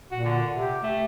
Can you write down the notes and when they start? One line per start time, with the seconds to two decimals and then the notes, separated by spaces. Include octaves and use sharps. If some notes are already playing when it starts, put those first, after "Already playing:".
0.12 A#2 F#4
0.25 D3
0.54 C3 G4
0.83 A3